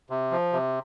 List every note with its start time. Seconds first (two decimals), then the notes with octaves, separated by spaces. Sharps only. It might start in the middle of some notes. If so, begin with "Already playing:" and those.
0.10 C3
0.31 F3
0.53 C3